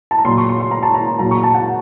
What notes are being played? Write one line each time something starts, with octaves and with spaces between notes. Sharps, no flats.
A5
A#5
A#2 F#3 C6
C#6
C6
C6
A#5
A5
A#5
A#2 F#3 A#5
C#6
A5
F#5